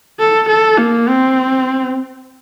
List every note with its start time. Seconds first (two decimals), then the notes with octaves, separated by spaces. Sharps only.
0.19 A4
0.48 A4
0.78 A#3
1.08 C4